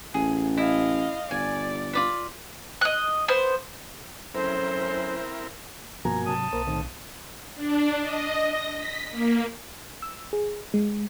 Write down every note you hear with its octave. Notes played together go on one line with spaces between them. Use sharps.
A1 G#4
E4 D#5 F5
G1 D5 G#5
F4 D5 B5
D#5 F#6
B3 C5
A2 F#3 C4 C#4 E4 A#4 C5
G2 B2 F3 A#3 F#4 G#5 A#5
G#2 C3 F#3 A5 D#6
B1 A#3 A#4 C5
A2 D#3 C4
D4
D#5
A#6
B6
A#3
E6
G#4
G#3